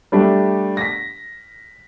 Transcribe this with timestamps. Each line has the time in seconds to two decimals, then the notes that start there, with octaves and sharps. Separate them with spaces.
0.12 G3 A3 D4 G4
0.77 A#6 B6